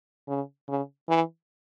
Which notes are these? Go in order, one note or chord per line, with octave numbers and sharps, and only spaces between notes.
C#3
C#3
E3